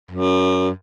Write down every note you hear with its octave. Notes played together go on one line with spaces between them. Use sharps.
F#2